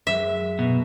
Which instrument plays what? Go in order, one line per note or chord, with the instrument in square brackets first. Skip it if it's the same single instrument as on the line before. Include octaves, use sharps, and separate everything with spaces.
[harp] F#2 G#3 [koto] E5
[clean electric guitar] B2 [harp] A#5